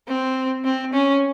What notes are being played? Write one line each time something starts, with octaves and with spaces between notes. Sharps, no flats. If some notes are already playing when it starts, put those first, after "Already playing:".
C4
C4
C#4